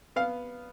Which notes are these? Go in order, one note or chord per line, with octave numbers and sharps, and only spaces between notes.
B3 F5